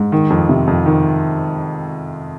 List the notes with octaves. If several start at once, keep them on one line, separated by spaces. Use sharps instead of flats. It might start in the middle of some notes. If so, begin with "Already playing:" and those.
Already playing: G#2
D#3
F2
C3
F2
D#3